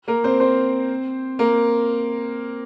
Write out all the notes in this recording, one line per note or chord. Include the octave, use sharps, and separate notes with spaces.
A#3 A#4
C4 C5
C4 C5
A#3 A#4